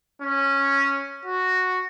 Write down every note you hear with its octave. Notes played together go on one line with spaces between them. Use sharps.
C#4
F#4